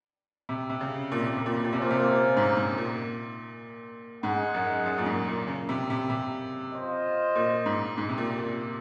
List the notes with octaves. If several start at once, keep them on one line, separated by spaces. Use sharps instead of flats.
C3
C3
C#3
A#2
C3
A#2
C3
A#2
C3
A#2
C3 A#3 C#4 F4 C5
A#2
C3
A#2
G#2
G#2
A#2
G#2 G#3 D#4 G#4 D#5 F#5
F#2
F#2
A#2
G#2
A#2
C#3
C3
C3
C3
F4 C5 D#5
A#2
G#2
G#2
C3
A#2
A#2